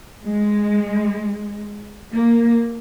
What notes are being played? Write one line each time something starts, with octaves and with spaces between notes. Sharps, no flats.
G#3
A#3